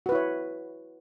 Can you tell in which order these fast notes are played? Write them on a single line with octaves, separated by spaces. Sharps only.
F#4 B4 E4 C#5